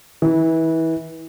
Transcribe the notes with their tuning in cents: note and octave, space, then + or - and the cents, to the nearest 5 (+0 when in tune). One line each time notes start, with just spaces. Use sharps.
E3 -25